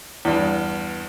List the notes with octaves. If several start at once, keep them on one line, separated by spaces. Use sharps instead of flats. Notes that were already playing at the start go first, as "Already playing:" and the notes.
E2 G2